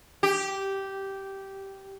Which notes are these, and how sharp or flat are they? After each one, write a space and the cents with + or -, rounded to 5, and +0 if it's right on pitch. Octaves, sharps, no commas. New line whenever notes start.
G4 -10